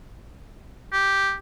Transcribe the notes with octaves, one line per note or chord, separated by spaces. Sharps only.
G4